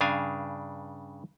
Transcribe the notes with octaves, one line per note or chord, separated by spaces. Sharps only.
G2 C#3 D4 F5 G#5